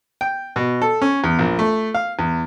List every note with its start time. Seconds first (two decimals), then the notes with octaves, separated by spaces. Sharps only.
0.21 G5
0.56 B2
0.82 A4
1.02 C#4
1.24 E2
1.39 A#1
1.59 A3
1.94 F5
2.19 E2